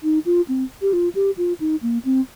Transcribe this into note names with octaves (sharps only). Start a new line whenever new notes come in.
D#4
F4
C4
G4
F4
G4
F4
D#4
A#3
C4